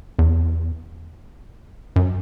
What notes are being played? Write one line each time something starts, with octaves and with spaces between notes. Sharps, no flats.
E2
F#2